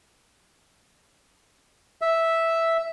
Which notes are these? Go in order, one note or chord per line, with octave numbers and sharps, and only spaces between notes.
E5